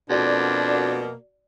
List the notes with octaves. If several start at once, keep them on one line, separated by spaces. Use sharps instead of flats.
F2 B2 A#3 D4 F#4 D5